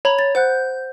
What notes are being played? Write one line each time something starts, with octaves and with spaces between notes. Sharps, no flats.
C#5 A#5 B5
A6
C5 F#5 F#6 G6